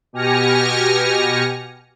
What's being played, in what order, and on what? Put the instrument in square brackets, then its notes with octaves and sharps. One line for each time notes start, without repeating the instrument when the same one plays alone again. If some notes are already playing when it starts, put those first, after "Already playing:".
[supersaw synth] B2 G4 G#5 F6 A#6 C#7